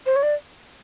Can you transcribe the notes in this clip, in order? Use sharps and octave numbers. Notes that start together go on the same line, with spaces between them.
C5
C#5
D5